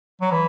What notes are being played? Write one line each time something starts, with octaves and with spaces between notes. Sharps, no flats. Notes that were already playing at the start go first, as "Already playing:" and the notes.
F#3
E3